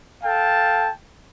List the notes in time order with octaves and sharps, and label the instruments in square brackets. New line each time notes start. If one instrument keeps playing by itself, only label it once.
[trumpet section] A4 F5 G5 A5